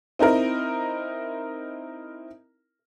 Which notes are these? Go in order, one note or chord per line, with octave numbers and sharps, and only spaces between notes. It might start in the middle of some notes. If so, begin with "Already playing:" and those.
C4 D#4 E4 A#4